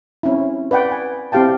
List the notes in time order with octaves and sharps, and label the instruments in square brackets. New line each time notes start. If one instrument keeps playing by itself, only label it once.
[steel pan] C4 C#4 E4
B4 D5 F#5 G5
G#5
C4 E4 G4 F5 G5 A5